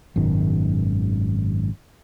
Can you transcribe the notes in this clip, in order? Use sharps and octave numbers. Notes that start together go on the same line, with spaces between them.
G#1 F#2 B2 D#3